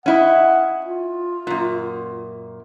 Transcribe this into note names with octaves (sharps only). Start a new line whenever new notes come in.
C#4 E4 D#5 F#5
F4
F#2 A#2